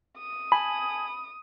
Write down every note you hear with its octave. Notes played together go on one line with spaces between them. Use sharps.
D#6
G#5 A5 B5 G#6